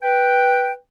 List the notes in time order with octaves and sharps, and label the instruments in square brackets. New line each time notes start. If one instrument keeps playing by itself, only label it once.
[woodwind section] B4 G5